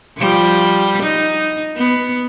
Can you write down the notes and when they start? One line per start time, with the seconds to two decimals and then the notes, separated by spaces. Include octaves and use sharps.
0.17 F3 G3
1.03 D#4
1.76 B3